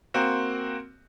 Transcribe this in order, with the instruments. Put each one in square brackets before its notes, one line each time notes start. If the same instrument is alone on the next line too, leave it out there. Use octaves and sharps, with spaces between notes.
[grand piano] A#3 C4 F#4